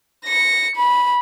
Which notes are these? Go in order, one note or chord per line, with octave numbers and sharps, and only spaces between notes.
A#6 C#7
B5